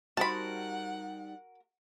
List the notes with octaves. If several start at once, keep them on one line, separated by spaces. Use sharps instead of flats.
G3 D#4 F#4 A#4 C5 F#5 A5 B5